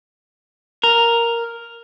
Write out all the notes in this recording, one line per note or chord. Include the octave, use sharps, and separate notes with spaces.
A#4